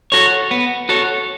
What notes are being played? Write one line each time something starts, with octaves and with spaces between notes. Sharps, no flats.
F#4 A4 C#5
B3
F#4 A4 C#5